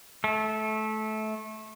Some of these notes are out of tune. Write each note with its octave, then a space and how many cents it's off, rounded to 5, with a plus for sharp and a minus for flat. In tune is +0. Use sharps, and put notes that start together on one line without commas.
A3 -20